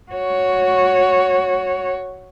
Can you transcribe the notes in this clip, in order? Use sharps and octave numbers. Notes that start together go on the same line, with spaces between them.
F#4 C#5